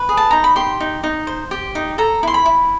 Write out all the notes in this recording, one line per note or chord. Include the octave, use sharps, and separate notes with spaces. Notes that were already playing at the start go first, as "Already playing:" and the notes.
Already playing: B4
G#4
A5
D#4 A#5
B5
G4 C6
D#4
D#4
C5
G4
D#4
A4 A#5
E4 C6
B5
E4